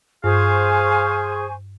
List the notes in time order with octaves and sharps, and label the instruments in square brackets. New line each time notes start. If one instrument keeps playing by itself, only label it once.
[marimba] G2 [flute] G#4 [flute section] C5 G#5 C#6 [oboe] F5